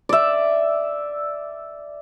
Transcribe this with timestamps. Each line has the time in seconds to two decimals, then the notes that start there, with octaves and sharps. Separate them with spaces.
0.09 D5 E5